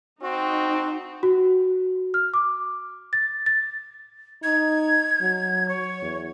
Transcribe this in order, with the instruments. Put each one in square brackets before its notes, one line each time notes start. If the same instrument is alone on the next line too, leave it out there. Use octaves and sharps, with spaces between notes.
[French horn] C4 [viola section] D#4 [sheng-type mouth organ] F#4
[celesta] F#4
F6
D6
A6
A6
[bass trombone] D#4 [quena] G#6
[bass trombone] F#3
[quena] C#5
[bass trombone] E2